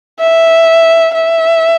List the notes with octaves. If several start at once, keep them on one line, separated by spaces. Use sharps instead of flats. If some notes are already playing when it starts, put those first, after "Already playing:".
E5
E5